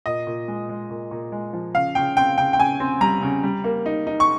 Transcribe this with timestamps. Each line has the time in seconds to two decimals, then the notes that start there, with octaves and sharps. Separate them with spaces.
0.06 A#2 D#5
0.27 A#2
0.48 G#3
0.69 G#3
0.90 A#2
1.11 A#2
1.32 G#3
1.53 F3
1.74 C#3 F5
1.95 C#3 G5
2.17 C4 G5
2.38 C#3 G5
2.53 G5
2.59 C#3 G#5
2.80 C4
3.01 G3 A#5
3.22 C#3
3.43 G3
3.64 A#3
3.86 D#4
4.07 D#4
4.20 C#6